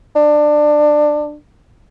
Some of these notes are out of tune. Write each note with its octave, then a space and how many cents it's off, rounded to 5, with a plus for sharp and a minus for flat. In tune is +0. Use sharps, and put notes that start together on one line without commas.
D4 +20